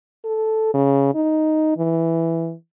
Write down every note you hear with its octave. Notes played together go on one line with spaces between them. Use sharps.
A4
C#3
D#4
E3